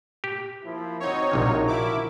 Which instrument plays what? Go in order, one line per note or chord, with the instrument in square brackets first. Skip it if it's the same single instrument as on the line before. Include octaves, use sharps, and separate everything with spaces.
[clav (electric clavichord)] G4
[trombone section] F3 A#3 E4
[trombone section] C4 F#4 [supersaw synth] D#4 C#5
[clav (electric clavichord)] A#1 C3 D#3 [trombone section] F3 F#4 A#4
[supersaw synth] E4 D6